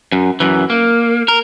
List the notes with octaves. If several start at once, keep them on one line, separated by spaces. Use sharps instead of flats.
F#2
F#2 E3
A#3
A#4